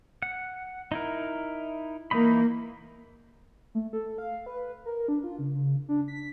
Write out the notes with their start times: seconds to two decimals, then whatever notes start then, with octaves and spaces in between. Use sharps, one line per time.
0.22 F#5
0.92 D#4 E4 A#4
2.11 E3 A#3 D#4 B5
3.75 A3
3.93 A4
4.18 F5
4.46 B4
4.86 A#4
5.08 D4
5.23 F4
5.39 C#3
5.88 D4
6.08 B6